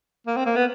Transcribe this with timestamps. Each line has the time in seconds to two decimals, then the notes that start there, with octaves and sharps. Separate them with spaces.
0.27 A#3
0.37 C4
0.46 A#3
0.56 B3